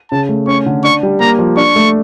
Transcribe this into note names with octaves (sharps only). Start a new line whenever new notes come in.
C#3 A5
A3
C#4 C#6
D3
D4 C#6
G3
A#3 A#5
F3
D4 C#6
A3